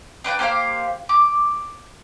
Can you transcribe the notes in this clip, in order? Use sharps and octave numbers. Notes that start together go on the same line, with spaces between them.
D4 B4 F#5 G5
A#3 G4 C5 F5
D6